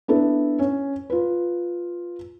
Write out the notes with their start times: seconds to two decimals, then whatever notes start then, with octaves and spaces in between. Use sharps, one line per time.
0.08 B3 D4 E4 A4
0.59 C#4
1.10 F4 B4